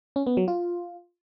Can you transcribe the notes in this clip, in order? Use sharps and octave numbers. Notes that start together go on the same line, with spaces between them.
C#4
B3
F#3
F4